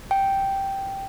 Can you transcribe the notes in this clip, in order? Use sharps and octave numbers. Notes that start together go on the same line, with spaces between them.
G5